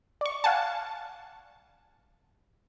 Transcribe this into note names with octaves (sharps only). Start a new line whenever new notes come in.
D5 C#6
F5 F#5 G#5 A5